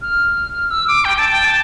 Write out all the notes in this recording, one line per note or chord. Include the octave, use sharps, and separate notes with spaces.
F6
E6
D6
G5
A5
G5
A5